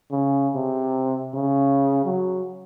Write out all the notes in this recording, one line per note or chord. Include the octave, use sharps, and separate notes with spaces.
C#3
C3
C#3
F#3